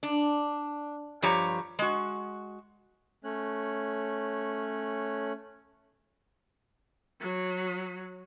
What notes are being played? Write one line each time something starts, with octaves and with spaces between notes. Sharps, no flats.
D4
G2 F3 G4 C#5 A#5
G#3 F#4
A3 C#4 C#5 F#6
F#3